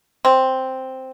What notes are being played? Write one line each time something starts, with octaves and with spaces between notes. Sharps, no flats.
C4